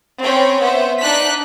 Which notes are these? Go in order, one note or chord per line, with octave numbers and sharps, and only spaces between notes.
C4 C#4 C#5 G5 B5
B3 C5 E5
D4 D#4 F#6 B6